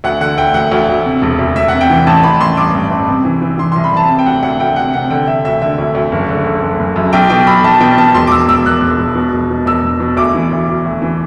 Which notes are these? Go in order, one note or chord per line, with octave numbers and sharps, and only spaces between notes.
D2 F#5
D3 F#5
D2 G5
D2 F#5
D2
D2
C3
E1
D2
E1 E5
C3 F#5
G5
E3
A1 A5
A1 B5
A1 C6
G2 D6
G2
A1
C3
E3
E3
E3 C6
C2 C6
B5
C2 A5
C3
G5
D2 F#5
D2 F#5
D2 G5
C3 F#5
C3 F#5
D3 G5
D3 E5
D2 E5
D3 E5
D2
D2
F#1
D3
D3
F#1
F#1
F#2
B1 G5
B2 G5
B1 B5
B1 A5
B2 G5
B2 A5
E1 C6
D6
E1 E6
E1 E6
E1 F#6
E1
E1
B2
E1
B2
E1 E6
E1
B2
D2 D6
E3
D2
D2
D2
E3